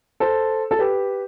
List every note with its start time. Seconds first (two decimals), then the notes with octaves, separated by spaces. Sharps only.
0.20 A4 C5
0.71 A4
0.79 G4 B4